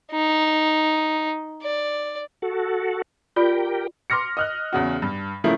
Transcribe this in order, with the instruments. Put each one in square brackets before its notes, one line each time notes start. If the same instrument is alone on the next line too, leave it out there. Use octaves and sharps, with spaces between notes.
[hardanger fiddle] D#4
D5
[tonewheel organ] F#4 A4
[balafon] F4 D5 B5 [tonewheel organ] G4 A#4 G5
[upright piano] C6 D6 F6 A#6 C#7
D#5 F6 F#6
E2 C#3 F#4
G2
C#3 F3 A3 E4 A#4